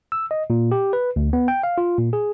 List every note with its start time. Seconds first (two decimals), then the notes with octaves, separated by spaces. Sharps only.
0.12 E6
0.31 D#5
0.50 A#2
0.72 G4
0.93 B4
1.16 D2
1.33 B3
1.48 G5
1.63 F5
1.78 F4
1.98 A#2
2.13 G#4